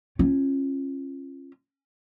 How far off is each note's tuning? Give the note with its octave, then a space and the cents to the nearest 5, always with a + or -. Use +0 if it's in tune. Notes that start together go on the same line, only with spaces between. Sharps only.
C#4 -30 F4 -25